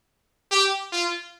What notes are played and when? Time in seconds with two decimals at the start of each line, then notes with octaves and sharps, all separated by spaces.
0.52 G4
0.92 F4